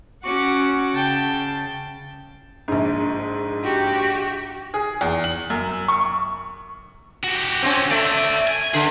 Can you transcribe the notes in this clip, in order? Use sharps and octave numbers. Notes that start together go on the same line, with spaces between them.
C#4 F#4 F#5 C#6 D6
C#3 G5 A5
A#1 G#2
F#4 G4
G#4
E2
F#7
F#2
C#6
F#4 G4
C4 C#4
A3 D5 E5
G#5
D3 G#4 B4